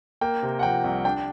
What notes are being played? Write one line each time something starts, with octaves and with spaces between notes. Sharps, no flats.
A#3 G5
C3
F#5
F3 G5
C2
D4 G5